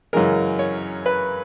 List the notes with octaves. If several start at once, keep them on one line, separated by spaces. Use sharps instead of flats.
F#2 C#3 E3 G#3 A#4
C#5
B4